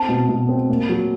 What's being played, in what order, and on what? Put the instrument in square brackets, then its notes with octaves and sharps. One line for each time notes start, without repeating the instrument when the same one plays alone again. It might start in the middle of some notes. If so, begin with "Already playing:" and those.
Already playing: [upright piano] C4 [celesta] A5
[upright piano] B2
B2
C4
A#2
F#3